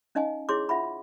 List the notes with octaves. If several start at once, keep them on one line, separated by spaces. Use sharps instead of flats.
C#4 D#4 D#5 F5 G#5
E4 G#4 C#5 C6 D6
F4 E5 F#5 B5